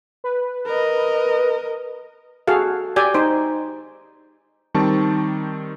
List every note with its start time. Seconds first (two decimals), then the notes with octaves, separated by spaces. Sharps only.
0.24 B4
0.67 A#4 D#5
2.47 F#4 G#4 A4 F5
2.96 G4 D5 G5 G#5
3.14 D#4 C5
4.74 D#3 G3 C4 A5 C#6